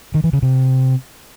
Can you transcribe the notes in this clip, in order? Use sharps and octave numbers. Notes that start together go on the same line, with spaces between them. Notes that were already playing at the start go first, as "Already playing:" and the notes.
D#3
E3
C#3
C3